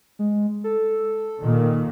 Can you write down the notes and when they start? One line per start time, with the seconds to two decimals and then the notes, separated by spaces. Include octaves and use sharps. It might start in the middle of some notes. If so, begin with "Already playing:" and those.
0.19 G#3
0.64 A4
1.40 A#2 D#3